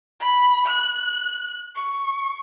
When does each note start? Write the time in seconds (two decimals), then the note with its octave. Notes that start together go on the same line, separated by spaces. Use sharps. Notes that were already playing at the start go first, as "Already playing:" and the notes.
0.19 B5
0.66 F#6
1.75 C#6